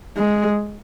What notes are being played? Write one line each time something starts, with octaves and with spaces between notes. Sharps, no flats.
G#3